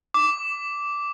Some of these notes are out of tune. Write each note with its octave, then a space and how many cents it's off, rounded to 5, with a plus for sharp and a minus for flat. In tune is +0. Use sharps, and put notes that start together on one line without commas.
D6 -10